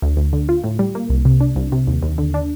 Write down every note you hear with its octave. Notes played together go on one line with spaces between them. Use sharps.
D2
D2
D3
F4
A2
G3
A#3
C2
C3
D4
C2
C3
D#2
D#2
D3
D4